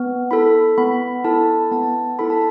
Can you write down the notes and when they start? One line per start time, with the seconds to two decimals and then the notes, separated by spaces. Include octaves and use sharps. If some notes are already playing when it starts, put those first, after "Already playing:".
Already playing: B3
0.31 E4 A4 B5
0.78 B3 B5
1.24 E4 A4 A5
1.71 B3 A5
2.19 E4 A4 B5
2.30 A5